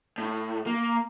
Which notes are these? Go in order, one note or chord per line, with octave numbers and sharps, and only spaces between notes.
A2
A#3